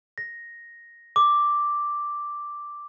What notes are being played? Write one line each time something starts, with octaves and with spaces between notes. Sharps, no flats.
A#6
D6